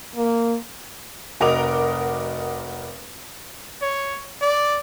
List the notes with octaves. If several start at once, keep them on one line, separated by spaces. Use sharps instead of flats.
A#3
F1 F#4 A#4 D#5 D6 F7
C#5
D5